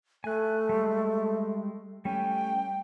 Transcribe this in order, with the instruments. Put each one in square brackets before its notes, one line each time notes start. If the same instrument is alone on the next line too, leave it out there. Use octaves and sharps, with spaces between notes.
[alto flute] A3 [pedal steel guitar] G#5 F#6
[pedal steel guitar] G3 G#3
[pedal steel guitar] G3 A3 C#4 [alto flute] G5